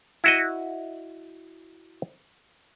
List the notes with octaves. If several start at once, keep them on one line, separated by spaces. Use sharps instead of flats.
E4 F#4 D#5